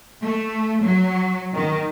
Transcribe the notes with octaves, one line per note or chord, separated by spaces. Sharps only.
A3
F#3
D#3